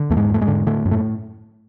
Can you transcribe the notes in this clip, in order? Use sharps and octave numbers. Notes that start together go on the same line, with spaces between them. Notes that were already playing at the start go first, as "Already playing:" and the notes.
Already playing: D3
E2 A3
G#2 G#3
E2 A3
G#2 G#3
D3
A2 D3 A3
F#2
A2 A3